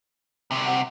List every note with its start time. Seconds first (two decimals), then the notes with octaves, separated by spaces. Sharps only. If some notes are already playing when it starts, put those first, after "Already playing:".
0.51 C2 C3
0.66 F#5